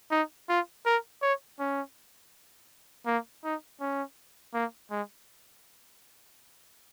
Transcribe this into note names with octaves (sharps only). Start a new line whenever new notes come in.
D#4
F4
A#4
C#5
C#4
A#3
D#4
C#4
A#3
G#3